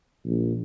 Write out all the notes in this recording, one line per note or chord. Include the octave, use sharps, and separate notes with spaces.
A#1